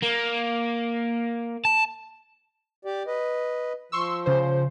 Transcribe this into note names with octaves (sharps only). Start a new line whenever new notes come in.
A#3
A5
G4 D5
B4 D#5
F3 C6 C#6 E6
C#3 C5